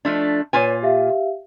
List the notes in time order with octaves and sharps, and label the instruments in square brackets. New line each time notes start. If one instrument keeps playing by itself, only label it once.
[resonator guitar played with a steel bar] F3 A3 D4
[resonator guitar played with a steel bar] A#2 F4 G#5 [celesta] B4 C#5
[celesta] G4 E5 F5